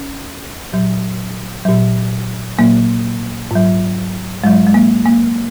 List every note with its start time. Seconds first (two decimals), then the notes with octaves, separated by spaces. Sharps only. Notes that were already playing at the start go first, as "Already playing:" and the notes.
Already playing: C#4
0.73 A#2 F#3
1.65 A#2 F#3
2.58 A#2 F#3 A#3
3.51 G#2 F#3
4.44 G#2 F#3 G#3
4.67 G#3
4.74 A#3
5.06 A#3